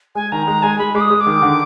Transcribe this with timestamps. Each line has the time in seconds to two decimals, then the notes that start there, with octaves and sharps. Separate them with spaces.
0.15 G#3 G#5
0.32 D#3 A#5
0.47 G#3 A#5
0.63 G#3 G#5
0.78 G#3 B5
0.95 G#3 D6
1.01 D#6
1.10 G#3
1.21 D6
1.27 D#3
1.42 D3